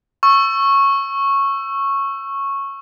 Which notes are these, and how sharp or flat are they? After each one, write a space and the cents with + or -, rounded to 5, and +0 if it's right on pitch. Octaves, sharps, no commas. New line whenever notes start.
C#6 -10 E6 +20